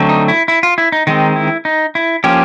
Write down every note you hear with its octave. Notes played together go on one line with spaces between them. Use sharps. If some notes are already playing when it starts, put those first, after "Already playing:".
Already playing: D3 F#3 A3 C4
D#4
E4
E4
F4
E4
D#4
D#3 G#3 C4 D#4
E4
D#4
E4
F3 A#3 C#4 G4